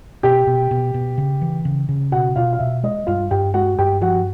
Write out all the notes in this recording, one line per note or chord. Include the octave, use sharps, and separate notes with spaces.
B2 G4 G5
B2
B2
B2
C#3
E3
C#3
C#3
B2 F#4 F#5
B2 F4 F5
F5
B2 E5
G#3 D#5
G2 F4 F5
G2 G4 G5
G#3 F#4 F#5
G2 G4 G5
F3 F#4 F#5